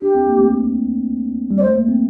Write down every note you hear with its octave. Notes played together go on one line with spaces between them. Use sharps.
D4 G4
C4
A#3
A3 C4
G3
D5
A3 C5
A#3
C4